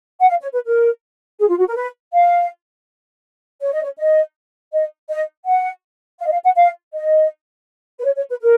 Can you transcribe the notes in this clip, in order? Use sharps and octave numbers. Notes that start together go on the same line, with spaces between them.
F#5
F5
C#5
B4
A#4
G#4
F4
F#4
A#4
B4
F5
C#5
D#5
C#5
D#5
D#5
D#5
F#5
F5
D#5
F5
F#5
F5
D#5
B4
C#5
C#5
B4
A#4